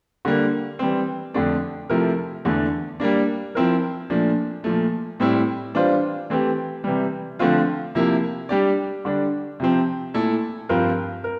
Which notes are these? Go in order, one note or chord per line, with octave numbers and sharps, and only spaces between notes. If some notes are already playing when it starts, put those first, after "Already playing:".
D3 G3 A#3
E3 G3 C4
F2 D3 A3 D4
C3 F3 A3 E4 A#4
E2 D3 A3
G3 A#3 D4
F3 C4 E4 A#4
A#2 F3 A3 D4
A#2 F3 A3
A2 G3 C4 E4
E3 G3 D4 F4 C5
E3 A3 C4 G4
C3 E3 G3
D3 F3 A3 C4 F4
C3 F3 A#3 E4
G3 D4 G4 D5
D3 G3 D4
C3 F3 C4
A#2 A3 E4 A4
G2 F3 C4 F4 A#4
A#4